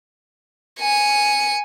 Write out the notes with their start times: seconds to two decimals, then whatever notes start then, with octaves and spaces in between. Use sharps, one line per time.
0.80 G#5 C#7